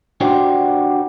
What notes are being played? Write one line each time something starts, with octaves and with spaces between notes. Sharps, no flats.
D4 F#4 G4 C5 D5